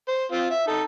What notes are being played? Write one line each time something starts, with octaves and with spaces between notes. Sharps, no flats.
C5
C4 F4
E5
D#4 A4